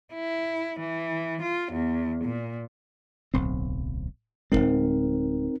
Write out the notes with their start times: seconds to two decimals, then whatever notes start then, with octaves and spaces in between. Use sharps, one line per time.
0.14 E4
0.80 E3
1.42 F4
1.72 E2
2.24 A#2
3.34 D1 B1 C4
4.52 D1 G#1 G#3 C4 D#4 A#4